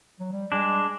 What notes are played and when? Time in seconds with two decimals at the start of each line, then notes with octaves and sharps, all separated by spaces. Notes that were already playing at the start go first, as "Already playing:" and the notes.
0.20 F#3
0.32 G3
0.52 G3 G#3 D4